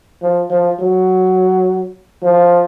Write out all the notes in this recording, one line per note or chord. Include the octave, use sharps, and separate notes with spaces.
F3
F3
F#3
F3